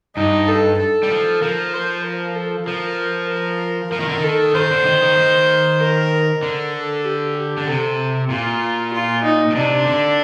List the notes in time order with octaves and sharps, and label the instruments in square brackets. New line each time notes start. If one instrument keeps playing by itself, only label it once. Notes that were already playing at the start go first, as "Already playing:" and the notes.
[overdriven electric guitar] G2 [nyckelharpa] D#4
[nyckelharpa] A4
A4
[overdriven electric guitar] G3
F3
[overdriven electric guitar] F3 [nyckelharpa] A#4
[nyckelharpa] C5
A#4
A4
[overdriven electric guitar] F3 [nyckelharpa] A#4
[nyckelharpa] A#4
[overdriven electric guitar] F3 [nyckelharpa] A#4
[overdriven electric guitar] D#3
D3
D#3
[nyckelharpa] A4
[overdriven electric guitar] D#3 [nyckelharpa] C5
[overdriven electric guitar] D3
D#3
D#3
D#3
[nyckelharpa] A#4
[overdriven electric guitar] D3
[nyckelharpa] A4
G4
G4
[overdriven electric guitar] D3
[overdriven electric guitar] C3 [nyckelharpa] A4
[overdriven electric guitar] A#2 [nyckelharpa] F4
[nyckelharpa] F4
D#4
[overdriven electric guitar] A#2
[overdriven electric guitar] C3 [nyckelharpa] D4
[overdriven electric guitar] D3